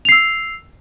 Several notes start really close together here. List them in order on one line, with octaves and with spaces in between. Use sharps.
F7 C7 E6